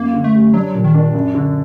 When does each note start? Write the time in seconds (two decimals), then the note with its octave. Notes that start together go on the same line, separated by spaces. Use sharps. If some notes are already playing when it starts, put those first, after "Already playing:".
Already playing: F#2 A#3
0.14 D3
0.24 A3
0.35 G3
0.54 F#3 D4
0.74 A#2
0.84 D#3
0.94 D4
1.14 F#2
1.35 D3